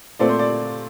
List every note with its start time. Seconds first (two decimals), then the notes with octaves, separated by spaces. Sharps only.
0.19 A#2 A3 C4 D5
0.29 C5
0.39 D5